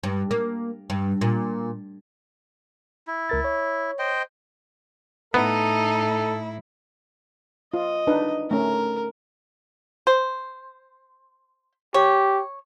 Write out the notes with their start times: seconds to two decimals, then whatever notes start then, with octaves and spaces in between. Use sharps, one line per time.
0.03 G2
0.31 A#3
0.90 G2
1.21 A#2
3.08 E4
3.29 C#2 A#4 A6
3.45 C#5
3.99 C5 D#5 G5
5.34 A2 B3 D#4 E4 A4
7.74 F4 D#5
8.07 D4 D#4 B4
8.51 A3 C#4 A#4
10.07 C5
11.94 G4 C#5